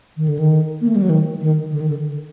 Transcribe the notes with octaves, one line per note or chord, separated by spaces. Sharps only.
D#3
D3
D#3
A#3
A3
G3
F#3
D#3
D#3
D3
D#3
D3